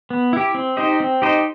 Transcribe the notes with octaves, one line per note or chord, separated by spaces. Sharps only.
B3
E4 G4
C4
D#4 G4 C5 D#5
C4
D#4 G4 C5 D#5